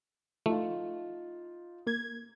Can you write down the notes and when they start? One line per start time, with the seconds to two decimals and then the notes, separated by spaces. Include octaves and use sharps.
0.46 F3 A3 D#4 F4
1.87 A#3 G#6